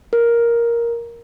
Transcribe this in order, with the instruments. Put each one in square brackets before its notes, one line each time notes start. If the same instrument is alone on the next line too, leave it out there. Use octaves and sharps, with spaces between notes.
[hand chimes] A#4